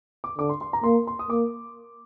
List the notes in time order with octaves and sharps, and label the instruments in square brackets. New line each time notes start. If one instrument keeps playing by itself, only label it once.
[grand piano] D6
[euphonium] D3 [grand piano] D6
[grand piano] C6
C6
A#5
[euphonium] A#3 [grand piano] C6
[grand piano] C6
D#6
[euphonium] A#3 [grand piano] D6